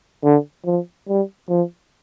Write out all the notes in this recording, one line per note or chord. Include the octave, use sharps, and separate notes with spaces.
D3
F3
G3
F3